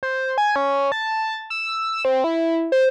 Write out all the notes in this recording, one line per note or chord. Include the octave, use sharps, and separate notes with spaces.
C5
G#5
C#4
A5
E6
C4
E4
C5